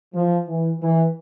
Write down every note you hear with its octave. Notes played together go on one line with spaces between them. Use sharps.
F3
E3
E3